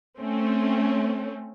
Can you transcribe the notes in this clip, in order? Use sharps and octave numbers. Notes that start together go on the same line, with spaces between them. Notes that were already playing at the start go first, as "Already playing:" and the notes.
A3 C4 C#4